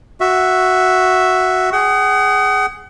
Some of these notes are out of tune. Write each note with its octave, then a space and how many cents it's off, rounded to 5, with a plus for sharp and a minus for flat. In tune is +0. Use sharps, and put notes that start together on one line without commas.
F#4 +0 E5 +0
G#4 -5 F#5 +40